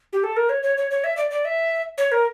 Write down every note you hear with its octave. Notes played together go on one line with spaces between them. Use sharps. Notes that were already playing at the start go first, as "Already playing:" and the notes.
G4
A4
A#4
C#5
C#5
C#5
C#5
E5
D5
D5
E5
C#5
A#4